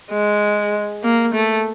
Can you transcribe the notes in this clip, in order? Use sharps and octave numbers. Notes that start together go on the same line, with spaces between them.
G#3
A#3
A3